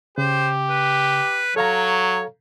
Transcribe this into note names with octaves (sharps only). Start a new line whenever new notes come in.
C#3 G4 C5
B4
F#3 A4 C#5 F5 A#5